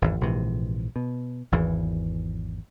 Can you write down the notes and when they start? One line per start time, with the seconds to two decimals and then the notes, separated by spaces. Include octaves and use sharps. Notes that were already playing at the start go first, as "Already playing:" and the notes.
0.02 G#1 E2
0.21 A#1 G#2 C3 E3
0.96 B2
1.52 G#1 E2 E3